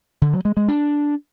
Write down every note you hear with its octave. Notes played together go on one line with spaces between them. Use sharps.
D3
F#3
G#3
G#3
D4